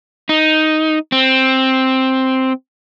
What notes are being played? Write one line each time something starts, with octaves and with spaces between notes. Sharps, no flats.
D#4
C4